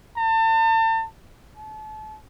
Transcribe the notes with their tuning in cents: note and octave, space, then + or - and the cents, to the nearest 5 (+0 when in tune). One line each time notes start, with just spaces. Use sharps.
A5 +35
A5 -35